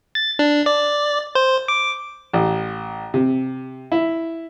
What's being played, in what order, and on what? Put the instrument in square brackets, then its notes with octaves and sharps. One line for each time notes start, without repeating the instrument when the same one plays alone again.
[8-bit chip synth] A6
D4
D5
C5
D6
[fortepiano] A1
C3
E4